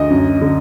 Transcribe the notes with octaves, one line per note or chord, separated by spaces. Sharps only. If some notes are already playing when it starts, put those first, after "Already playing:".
Already playing: D2 D#5
F#2
D3